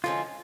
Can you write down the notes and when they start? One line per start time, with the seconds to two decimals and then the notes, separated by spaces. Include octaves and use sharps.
0.04 D3 F3 G#3 C#4 F4